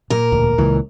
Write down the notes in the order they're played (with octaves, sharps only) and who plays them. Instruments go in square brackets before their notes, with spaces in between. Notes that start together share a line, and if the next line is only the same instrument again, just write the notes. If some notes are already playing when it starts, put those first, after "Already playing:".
[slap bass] A#2 [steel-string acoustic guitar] A#4
[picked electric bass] E1 D2
[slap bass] C#2 [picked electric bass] A#2 E3